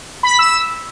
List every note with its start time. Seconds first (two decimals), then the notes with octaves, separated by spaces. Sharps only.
0.23 B5
0.31 B6
0.39 E6